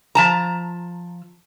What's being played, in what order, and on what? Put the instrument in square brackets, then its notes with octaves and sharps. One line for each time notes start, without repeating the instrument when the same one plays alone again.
[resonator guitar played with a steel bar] F3 A5 A#5